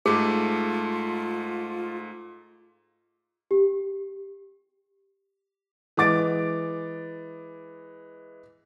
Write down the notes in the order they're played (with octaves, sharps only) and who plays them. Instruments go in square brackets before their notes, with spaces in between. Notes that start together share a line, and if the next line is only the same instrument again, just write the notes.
[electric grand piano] G#2 A3 [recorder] F4 [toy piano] G#4
[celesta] G4
[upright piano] E3 G#3 D6 A6 D7